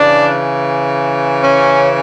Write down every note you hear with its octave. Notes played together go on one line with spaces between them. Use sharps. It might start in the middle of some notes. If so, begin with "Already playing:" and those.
Already playing: C#3 E3 D4
C#4